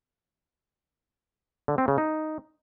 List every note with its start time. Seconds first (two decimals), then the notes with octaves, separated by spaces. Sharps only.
1.68 D3
1.78 C4
1.88 C#3
1.98 D#4